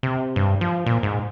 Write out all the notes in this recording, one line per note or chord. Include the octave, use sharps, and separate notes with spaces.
C3
G2
F3
A#2
G#2